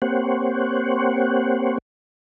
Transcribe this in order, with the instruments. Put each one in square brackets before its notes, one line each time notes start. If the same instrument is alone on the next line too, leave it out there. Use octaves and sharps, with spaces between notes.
[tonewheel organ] A#3 C4 G4 C5 C#5 F#5